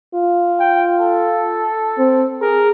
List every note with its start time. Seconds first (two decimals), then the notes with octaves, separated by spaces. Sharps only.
0.15 F4
0.60 G5
1.00 A4
1.98 C4
2.42 G#4 A#4